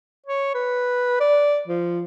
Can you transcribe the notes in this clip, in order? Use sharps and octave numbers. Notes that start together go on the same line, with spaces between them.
C#5
B4
D5
F3